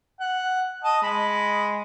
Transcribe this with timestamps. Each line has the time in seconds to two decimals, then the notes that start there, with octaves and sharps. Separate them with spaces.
0.20 F#5
0.84 D#5 A5
1.03 G#3 B5